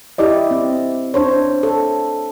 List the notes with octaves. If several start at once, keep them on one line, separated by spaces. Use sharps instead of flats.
E4 G4 D5 D#5
C4
D4 C5 C#5
A4